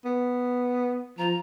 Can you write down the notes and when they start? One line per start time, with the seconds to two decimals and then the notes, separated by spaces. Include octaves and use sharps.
0.05 B3
1.19 F3 A#5